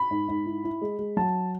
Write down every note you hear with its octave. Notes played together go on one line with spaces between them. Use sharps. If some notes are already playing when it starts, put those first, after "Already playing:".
Already playing: B5
G#2
G#2
E4
E4
G#3
G#3
F#3 A5